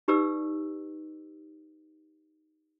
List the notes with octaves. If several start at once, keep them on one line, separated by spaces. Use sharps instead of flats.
D#4 G4 B4 D5 E6